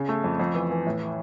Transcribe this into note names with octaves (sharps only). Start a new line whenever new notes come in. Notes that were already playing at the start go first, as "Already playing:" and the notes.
Already playing: C#3
A3
F2
F2
E3
E3
A2